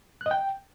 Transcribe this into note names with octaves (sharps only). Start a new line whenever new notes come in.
F#6
D#5
G5